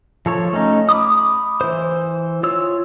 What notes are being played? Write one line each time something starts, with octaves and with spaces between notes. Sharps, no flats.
F3 A4 C#5
A3 C#4 D#4
B5 D6 D#6
E3 C5
F4 C#5 E6